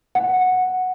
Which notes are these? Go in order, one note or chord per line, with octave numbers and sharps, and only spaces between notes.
F#5